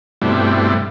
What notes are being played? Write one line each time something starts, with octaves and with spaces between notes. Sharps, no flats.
G2 B2 G3 A3 C4 E4